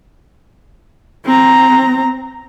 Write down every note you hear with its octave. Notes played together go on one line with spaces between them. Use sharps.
C4 A#5